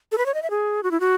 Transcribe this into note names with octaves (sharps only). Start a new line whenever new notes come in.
A4
B4
C#5
D#5
E5
G#4
F#4
E4
F#4